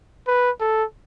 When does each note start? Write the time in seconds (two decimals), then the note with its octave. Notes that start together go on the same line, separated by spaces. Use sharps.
0.27 B4
0.60 A4